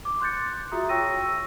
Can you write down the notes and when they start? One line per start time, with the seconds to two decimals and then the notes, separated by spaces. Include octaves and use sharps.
0.05 D6
0.21 C6 F#6 G6 A6 C#7
0.72 F4 F#4 G#4 E5 A#5 D#6
0.89 C#5 G5 C#6 E6 A#6 D#7
1.23 E6